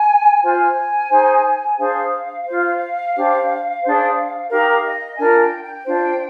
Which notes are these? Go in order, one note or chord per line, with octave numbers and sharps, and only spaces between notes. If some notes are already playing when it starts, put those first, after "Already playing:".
Already playing: G#5
F4 C5 G#5
D#4 G#4 C5
D4 G#4 C5 F5
F4 C5
D4 G4 C5
D4 G#4 C5
D#4 G4 A#4 F5
D#5
D4 F4 A#4 G#5
G5
G5
D4 F4 C5